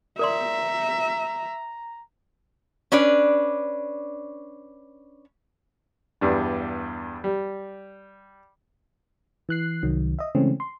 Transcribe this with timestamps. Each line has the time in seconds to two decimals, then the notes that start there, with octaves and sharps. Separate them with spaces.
0.19 A#4 D5 E5 A#5 C6
2.92 C#4 D4 B4 D5
6.21 E2 G2 D4
7.24 G3
9.49 E3 F#6 C7
9.83 C2 D#3 F#3
10.19 D#5 E5
10.35 C#3 E3 G#3 A3 C4 C#4
10.60 C6